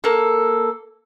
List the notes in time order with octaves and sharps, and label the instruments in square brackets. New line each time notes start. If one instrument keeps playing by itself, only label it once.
[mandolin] A#3 A4